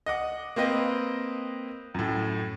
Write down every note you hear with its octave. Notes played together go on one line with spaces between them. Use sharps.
D#5 F#5 D6
A#3 C4 B4 D#5
F#2 A2